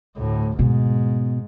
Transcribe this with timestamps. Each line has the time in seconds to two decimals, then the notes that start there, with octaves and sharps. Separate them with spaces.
0.17 D2 A2
0.59 G#2 B2